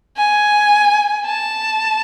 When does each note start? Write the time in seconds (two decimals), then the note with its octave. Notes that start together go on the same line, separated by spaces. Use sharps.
0.17 G#5
1.26 A5